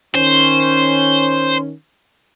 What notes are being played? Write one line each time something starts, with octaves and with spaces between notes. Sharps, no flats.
D#3 C#4 C5